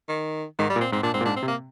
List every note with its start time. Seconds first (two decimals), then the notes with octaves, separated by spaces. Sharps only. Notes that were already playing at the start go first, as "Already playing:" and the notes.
0.09 D#3
0.59 G#2 D#3
0.70 G3
0.76 A#2
0.81 C4
0.92 G#2 C4
1.03 A#2 D4
1.14 G#2 C4
1.21 A#2
1.25 G#2 D4
1.36 C4
1.43 C3
1.48 A#3